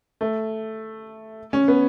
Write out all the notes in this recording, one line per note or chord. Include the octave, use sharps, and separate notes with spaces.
A3
C#4
B3